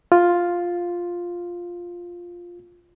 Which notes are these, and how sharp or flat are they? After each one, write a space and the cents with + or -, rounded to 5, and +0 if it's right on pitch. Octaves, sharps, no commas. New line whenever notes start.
F4 +5